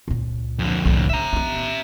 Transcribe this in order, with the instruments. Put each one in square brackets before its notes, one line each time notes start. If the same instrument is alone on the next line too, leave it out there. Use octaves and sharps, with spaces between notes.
[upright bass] C#2 A#2
[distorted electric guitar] F2 D3
[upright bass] C2 A2
[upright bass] B3 [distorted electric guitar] E5 A#5
[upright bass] B3 D#4